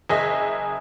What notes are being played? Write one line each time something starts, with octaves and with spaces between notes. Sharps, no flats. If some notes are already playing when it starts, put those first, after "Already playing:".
F#1 G#4 D#5 E5 B6